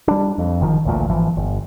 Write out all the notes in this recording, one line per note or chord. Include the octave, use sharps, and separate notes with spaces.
G3 D4
F2
F#1 D#3 F3
A1 D2 A#2
G#1 E3 F3
G1